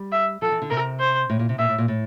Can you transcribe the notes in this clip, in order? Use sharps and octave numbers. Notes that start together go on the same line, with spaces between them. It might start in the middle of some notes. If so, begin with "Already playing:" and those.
Already playing: G3
E5
F3 A4
E3
D3
C3 A#4
C5
A2
A#2
C3
A#2 E5
A2
A#2
A2